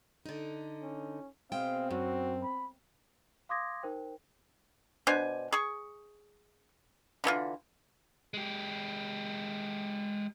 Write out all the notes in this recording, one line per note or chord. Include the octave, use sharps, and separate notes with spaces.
D3 D#4
C#4
B2 G#3 C4 F5 G5
F#2 F#4
B5
F5 C6 D6 D#6 G#6 A#6
D#4 A#4 C5 G5
B2 D4 C5 G#5
G#4 C#6
D3 E3 E4 F4
G#3 G4